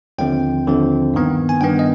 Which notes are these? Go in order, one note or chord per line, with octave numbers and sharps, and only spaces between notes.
D#2 D3 F3 C4 G5
D#2 D3 F3 C4
G2 D#3 B3
G#5
G2 D#3 B3 G5
D#5